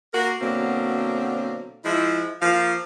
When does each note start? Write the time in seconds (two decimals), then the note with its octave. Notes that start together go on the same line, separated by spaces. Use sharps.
0.13 A#3 F#4 A#4
0.41 B2 D3 F#3 A#3 C4
1.84 F3 G#3 E4
2.41 F3 A#3 F5